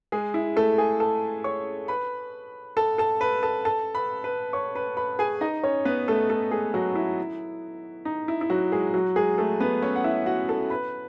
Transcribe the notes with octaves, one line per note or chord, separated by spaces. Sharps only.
G#3 G#4
E4
A3 A4
G#4 G#5
A4 A5
C#5 C#6
B4 B5
A4 A5
A4 A5
B4 B5
A4 A5
A4 A5
B4 B5
B4 B5
C#5 C#6
B4 B5
B4 B5
G#4 G#5
D#4 D#5
C#4 C#5
B3 B4
A3 A4
A3 A4
G#3 G#4
F#3 F#4
E4
D#4
E4
E4
F#3 F#4
G#3 G#4
F#3 F#4
G#3 G#4
A3 A4
B3 B4
C#4 C#5
F#5
E4 E5
F#4 F#5
A4 A5
B4 B5